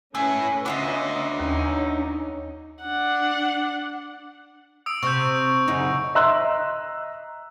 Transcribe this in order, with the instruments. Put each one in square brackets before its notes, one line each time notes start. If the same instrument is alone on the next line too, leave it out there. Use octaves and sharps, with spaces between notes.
[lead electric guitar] A3 E4 [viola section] C#4 B4 [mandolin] G#4
[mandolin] B3 E4 F4 [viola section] C#4 D#5 [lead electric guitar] D4 E5
[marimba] D#2 [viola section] C#4 D#4
[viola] D4 F#5
[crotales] D#6 E6 D7
[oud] C3 [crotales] C#6 E6 G6
[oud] F#2 C#3 D#4
[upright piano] D#5 E5 A#5 C6 E6 F#6